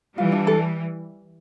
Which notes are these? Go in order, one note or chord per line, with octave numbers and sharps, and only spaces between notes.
E3 G3 F4
D4
A4